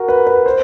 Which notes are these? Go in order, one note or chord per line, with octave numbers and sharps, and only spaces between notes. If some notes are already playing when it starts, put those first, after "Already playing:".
Already playing: F#4 A#4
B4
B4
C5